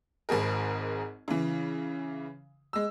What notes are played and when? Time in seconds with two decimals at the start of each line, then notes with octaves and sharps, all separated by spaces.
0.29 G#1 G#2 G#4 A#4
1.28 C#3 E3
2.73 G#3 E6